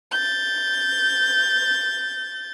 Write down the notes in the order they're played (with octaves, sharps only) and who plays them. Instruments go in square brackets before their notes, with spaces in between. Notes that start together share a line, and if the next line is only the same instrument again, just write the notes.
[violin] G6 A6